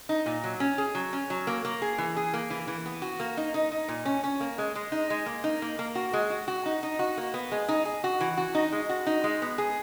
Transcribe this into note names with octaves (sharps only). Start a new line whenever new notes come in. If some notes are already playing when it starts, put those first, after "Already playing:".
D#4
A#2
F#3
C#4
G#4
F#3
C#4
F#3
A#3
A#3
G#4
E3
G#4
A#3
E3
E3
B3
F#4
A#3
D#4
D#4
D#4
A#2
C#4
C#4
A#3
G#3
G#3
D#4
G#3
A#3
D#4
A#3
A#3
F#4
G#3
F#4
F#4
D#4
D#4
F#4
A#3
B3
G#3
D#4
G#4
F#4
E3
F#4
D#4
G#3
F#4
D#4
G#3
B3
G#4